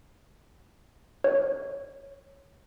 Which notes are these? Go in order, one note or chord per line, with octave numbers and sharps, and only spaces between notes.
C#5